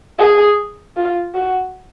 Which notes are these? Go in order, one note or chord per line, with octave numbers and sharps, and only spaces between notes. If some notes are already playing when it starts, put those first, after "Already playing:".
G#4
F4
F#4